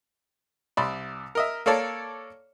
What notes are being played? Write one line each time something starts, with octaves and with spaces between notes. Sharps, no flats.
C2 D5 B5 C6
A#4 D#5 E5
A#3 A4 C#5 D5 A5